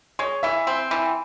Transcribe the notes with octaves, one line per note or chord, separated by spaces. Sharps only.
G#3 C#5
E3 E5
C4
E3